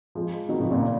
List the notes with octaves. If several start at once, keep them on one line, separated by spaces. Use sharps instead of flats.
F3 G#3
D#3 F#3
C#3 F3
A#2 C#3